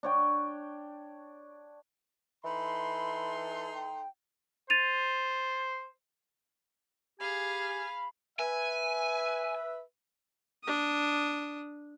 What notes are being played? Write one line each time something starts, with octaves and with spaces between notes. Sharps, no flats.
D4 C#5 G5
E3 D#4 A4 B5 C6
G5
C5 A6 D#7 F7
G4 G#4 F5 G#5 B5
B4 E5 G#5
D4 D#6